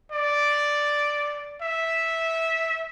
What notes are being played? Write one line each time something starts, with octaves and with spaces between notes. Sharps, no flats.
D5
E5